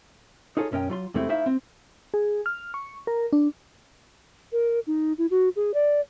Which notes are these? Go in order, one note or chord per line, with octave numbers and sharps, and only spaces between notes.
D#4 F4 G#4 A4 C#5
B1 F#2 C#4 A#4 D#5 G5
F#3 F4 C6
E2 C3 G#3 A3 C4 E4
A3 D#4 E4 C5 E5 F5
C4
G#4
F6
C#6
A#4
D4
A#4
D#4
E4
F#4
G#4
D5